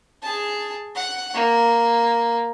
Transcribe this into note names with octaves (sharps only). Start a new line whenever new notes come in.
G#4 A5
F#5
A#3